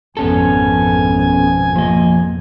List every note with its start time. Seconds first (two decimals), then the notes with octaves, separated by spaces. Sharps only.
0.17 G#1 F2 B2 B3 C#4 A4 G#5
1.76 F3 A#3 D#5